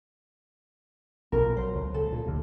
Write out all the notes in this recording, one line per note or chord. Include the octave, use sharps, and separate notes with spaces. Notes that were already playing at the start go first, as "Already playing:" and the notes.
B1 A#2 A#4
F#3 C5
C#2
C#3 A4
A#2
D2 C3